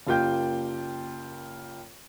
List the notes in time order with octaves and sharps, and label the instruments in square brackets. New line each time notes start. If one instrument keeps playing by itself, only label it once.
[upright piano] F#1 A#3 F4 G4 G5 G6